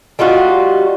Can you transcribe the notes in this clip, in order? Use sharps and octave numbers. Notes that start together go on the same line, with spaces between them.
G3 D#4 F4 F#4